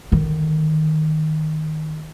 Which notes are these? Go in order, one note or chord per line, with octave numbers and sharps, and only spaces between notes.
D3 D#3